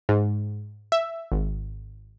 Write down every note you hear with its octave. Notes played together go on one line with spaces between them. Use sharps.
G#2
E5
G#1